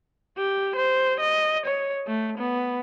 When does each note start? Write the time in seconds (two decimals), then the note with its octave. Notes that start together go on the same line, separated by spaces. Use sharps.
0.38 G4
0.76 C5
1.20 D#5
1.66 C#5
2.07 A3
2.38 B3